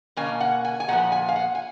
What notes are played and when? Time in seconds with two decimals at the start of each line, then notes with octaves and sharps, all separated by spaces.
0.16 B2 A#3 C#4 G#5
0.41 F#5
0.65 G#5
0.80 G#5
0.88 A#2 F3 B3 F#5
1.12 G#5
1.28 F5
1.36 F#5
1.55 G#5